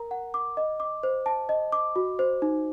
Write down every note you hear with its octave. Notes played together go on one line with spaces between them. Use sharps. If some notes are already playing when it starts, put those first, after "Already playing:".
Already playing: A#4 A#5
F#5
D6
D#5
D6
C5
A5
D#5
D6
F#4
C5
D#4